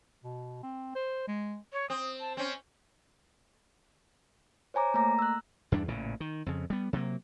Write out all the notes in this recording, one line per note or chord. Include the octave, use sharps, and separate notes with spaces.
B2
C4
C5
G#3
C#5
C4 D#6
A5
C4 C#4 C5
C5 C#5 G#5 A#5 D6
A3 A#3 A#5 A#6
E6 F#6
E2 G2 D4
A1 A#2 C#3
D#3
F2 C#3
G3 B3
C3 F#3 G3 A#3